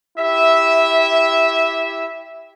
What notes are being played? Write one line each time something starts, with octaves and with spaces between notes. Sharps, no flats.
E4 G4 E5